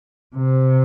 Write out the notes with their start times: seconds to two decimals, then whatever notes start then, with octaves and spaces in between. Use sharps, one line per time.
0.35 C3